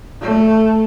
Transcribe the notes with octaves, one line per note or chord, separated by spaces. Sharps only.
A3